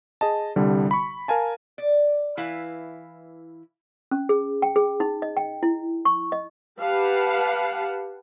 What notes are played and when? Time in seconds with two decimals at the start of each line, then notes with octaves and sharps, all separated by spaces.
0.21 G#4 D#5 A5
0.56 C2 D3 G3
0.91 B5 C#6
1.28 A#4 F5 G#5 A5
1.78 D5
2.37 E3 E4 B4 F5
4.11 C#4
4.29 G#4
4.62 G5
4.76 G#4
5.00 D#4
5.22 D#5
5.37 G5
5.63 E4
6.05 C#6
6.32 D#5
6.80 G4 B4 F5 F#5 A5